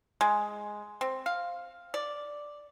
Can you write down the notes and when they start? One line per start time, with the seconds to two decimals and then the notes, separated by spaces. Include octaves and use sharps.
0.21 G#3
1.01 C4
1.26 F5
1.94 D5